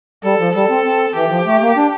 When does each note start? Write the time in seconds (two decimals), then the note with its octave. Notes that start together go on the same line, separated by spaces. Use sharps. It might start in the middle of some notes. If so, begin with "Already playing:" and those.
0.24 G3 A4
0.39 F3
0.55 G3 A4
0.70 C4
0.84 C4
1.15 E3 G4
1.30 F3
1.46 A3
1.62 A#3
1.77 D4